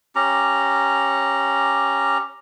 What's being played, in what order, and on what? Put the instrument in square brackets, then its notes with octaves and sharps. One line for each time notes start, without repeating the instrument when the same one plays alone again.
[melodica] C#4 G4 A#5